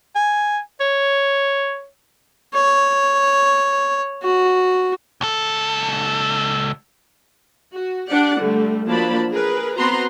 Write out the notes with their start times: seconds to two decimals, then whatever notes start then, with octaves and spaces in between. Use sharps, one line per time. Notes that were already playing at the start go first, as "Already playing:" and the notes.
0.15 G#5
0.80 C#5
2.54 C#5
4.23 F#4
5.21 C#2 A4
7.72 F#4
8.09 D4 G4 D5 F#5
8.41 D3 G3 A3
8.86 F3 F#3 A#3 D4 A5 B5
9.31 G#4 A#4 B4
9.78 B3 C4 F#4 B4 A#5 C6